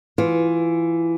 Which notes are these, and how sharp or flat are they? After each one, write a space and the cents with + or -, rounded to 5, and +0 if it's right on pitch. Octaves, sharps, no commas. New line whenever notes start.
E3 +15 F4 +10